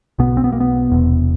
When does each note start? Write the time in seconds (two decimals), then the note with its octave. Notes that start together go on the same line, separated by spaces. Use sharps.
0.19 B1 B2 B3
0.37 C4
0.44 B3
0.52 A#3
0.60 B3
0.90 E1 E2 C3